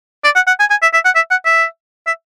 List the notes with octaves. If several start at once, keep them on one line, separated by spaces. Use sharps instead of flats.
D5
F#5
F#5
G#5
G#5
E5
E5
F#5
E5
F#5
E5
E5